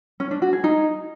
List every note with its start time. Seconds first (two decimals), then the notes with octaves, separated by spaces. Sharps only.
0.20 C#4
0.31 D4
0.42 F#4
0.53 G#4
0.64 D#4